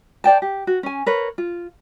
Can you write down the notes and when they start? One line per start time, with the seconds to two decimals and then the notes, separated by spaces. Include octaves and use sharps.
0.24 C5 D5 G5 A5
0.42 G4
0.67 F#4
0.83 C#4 G#5
1.06 A#4 B4 C#5
1.38 F4